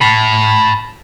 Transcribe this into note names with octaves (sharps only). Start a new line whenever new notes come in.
A5 B5